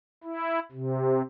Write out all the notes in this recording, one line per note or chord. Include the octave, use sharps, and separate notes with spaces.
E4
C3